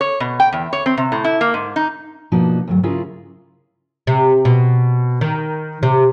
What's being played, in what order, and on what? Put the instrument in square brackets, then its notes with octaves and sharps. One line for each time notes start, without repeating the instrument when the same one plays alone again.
[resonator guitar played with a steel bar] C#5
B2
G5
E2
C#5
C4
C3
A2
E4
A#3
G#2
D#4
[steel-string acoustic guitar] B2 F3 A#3 D4 D#4 F#4
D2 G2 F#3
C#3 C#4 E4 F4 G#4 A#4
[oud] C3
B2
D#3
C3